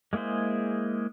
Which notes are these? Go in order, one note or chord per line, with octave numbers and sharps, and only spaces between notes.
G#3 A#3 E4 G#4 C5